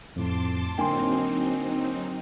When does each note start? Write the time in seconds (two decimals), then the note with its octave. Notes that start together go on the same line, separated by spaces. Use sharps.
0.16 F2 A2 A5 C6 D6
0.78 D3 F#3 A#3 C4 D#4 G5 G#5 C6